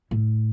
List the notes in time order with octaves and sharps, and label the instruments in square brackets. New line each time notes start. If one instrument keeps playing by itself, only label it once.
[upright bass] A2